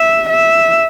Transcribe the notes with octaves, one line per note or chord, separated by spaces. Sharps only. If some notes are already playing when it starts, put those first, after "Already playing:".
Already playing: E5
E5